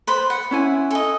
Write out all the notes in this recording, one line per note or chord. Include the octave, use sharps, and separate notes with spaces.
B4 C5 B5
F#5
C#4 E4 G#5
A4 D#5